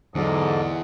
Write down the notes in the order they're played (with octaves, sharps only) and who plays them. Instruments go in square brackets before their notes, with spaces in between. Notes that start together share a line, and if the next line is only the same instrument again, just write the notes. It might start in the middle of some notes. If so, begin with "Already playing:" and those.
[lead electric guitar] E2 [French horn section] G#2 [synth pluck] D3 F#3 [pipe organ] A4 D5 D#5